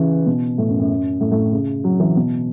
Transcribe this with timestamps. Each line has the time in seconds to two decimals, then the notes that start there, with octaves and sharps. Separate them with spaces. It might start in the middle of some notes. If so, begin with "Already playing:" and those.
Already playing: C#3 E3
0.27 B2
0.58 A2
0.69 F#2
0.80 F#2
1.21 A2
1.31 A2
1.53 C#3
1.84 F#3
2.00 E3
2.16 B2